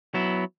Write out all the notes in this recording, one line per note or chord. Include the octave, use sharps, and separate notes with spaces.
F#3 B3 E4